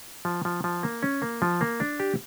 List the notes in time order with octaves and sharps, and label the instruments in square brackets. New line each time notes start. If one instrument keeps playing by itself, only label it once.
[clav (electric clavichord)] F3
F3
F3
A#3
C#4
A#3
F3
A#3
D4
G4